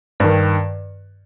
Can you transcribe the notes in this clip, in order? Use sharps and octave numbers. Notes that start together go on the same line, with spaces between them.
G2 D#3